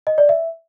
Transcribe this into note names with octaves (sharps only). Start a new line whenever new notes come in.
D#5
D5
E5